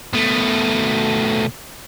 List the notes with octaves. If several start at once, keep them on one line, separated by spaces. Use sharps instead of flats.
B2 A3